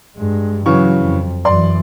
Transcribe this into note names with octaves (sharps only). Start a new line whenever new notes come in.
G2 G#3
C#3 E3 F#3 C#6
F2
F#2 E3 D5 C6